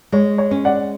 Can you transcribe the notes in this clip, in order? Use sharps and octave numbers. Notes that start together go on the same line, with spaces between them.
G#3 C#5
C#5
C#4
D5 F#5